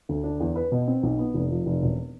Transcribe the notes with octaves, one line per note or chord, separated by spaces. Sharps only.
D2
D4
E2
B4
B2
C4
B1
B3
F1
F3
F1
E1